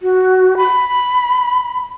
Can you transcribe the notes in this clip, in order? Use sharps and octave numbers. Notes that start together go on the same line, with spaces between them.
F#4
B5